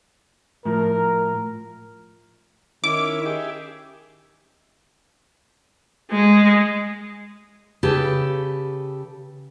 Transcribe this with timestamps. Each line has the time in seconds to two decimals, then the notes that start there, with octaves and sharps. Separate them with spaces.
0.65 A2 F3 A#4
2.84 D#3 C#4 E4 D6
3.26 G4 G#4 E5
6.11 G#3
7.83 C#3 G4 A4 B4